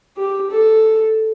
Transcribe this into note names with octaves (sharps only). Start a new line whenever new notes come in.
G4
A4